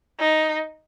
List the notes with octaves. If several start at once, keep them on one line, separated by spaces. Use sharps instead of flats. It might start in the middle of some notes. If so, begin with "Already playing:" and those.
D#4